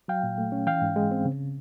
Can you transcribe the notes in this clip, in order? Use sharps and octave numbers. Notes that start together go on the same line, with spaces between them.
F#3 F5 G5
A#2
A3
C#4
E3 F5 G5
G#2
G#3
C4
C#3